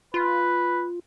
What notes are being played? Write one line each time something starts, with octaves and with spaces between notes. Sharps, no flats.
F4 B4